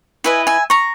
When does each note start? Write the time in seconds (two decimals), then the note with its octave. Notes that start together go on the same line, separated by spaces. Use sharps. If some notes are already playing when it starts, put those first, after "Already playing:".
0.24 E4 B4 D#5 E5 G#5
0.47 E5 G#5
0.70 A#5 C#6